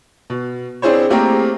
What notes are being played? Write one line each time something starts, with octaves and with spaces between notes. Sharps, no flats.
B2
C4 D4 E4 G#4 C5 C#5
A3 A#3 C4 G4 G#4 A#4